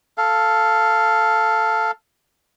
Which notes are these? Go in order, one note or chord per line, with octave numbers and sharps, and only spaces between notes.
A4 F5